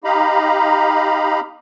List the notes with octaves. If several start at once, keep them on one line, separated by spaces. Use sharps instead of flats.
D#4 G4 D#5 F5 A#5 B5